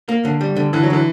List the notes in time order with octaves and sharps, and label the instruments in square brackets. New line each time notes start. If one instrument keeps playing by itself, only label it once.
[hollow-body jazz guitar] A#3
D3
G3
D3
[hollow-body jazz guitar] D3 [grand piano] E3
[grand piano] F#3
[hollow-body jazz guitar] D3 [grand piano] E3